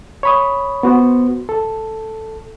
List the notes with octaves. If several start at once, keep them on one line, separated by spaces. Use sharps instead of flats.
C#5 B5 D#6
B3 F#4 C5
A4